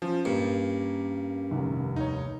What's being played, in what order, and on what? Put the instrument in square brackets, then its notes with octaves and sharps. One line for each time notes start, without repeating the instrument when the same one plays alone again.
[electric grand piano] F3 [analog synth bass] C#4
[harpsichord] G2 [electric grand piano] A#3
[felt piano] F1 C2 D#3
[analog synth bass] D#2 [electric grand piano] D#4 C#5